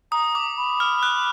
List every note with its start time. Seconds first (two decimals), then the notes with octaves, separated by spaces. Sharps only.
0.12 A#5 D#6
0.35 D6
0.57 B5
0.80 F6
1.03 F#6